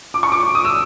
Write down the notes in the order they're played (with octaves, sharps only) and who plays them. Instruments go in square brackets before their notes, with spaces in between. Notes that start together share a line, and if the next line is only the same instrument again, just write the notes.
[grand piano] D6
C#6
D6
D#6
E6